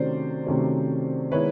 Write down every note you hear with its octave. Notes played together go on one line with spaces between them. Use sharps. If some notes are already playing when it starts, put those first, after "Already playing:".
Already playing: C3 D#3 F#3 A3 C#4 C5 D5
C3 D#3 F#3 A3 C#4
D#3 G#3 B3 E4 B4 C#5